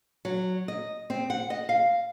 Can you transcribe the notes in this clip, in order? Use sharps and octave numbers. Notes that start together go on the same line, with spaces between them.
F#3
D#5
C4
F#5
D#5
F5